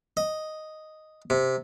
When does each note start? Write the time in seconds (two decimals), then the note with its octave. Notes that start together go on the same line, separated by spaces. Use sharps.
0.17 D#5
1.30 C3